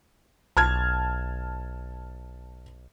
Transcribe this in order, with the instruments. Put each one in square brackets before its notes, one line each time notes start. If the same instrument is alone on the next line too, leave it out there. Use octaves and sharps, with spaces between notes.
[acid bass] B1 [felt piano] A5 F6 G#6